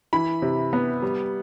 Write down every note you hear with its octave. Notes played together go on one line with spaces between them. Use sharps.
E3 B5
C3
B3
G3